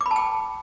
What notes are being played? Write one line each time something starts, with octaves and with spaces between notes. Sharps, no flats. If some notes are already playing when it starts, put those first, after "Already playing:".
D6
B5
A5
G5